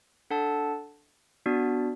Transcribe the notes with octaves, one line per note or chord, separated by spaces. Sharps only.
D4 A4 F#5 A5
B3 D4 F#4 D5